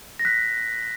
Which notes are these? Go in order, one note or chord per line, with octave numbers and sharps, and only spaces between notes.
A#6
F#6 B6